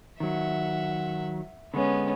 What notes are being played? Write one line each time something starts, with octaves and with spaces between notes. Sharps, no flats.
D#3 F#3 E5 F#5
D3 G#3 B3 C#4